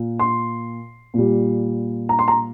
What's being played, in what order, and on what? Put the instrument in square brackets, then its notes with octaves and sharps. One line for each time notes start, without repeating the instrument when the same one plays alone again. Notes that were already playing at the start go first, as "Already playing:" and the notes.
Already playing: [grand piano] A#2
C6
A#2 G3
A#5
C6
A#5